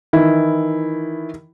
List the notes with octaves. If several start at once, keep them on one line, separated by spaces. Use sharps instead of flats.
D#3 E3 E4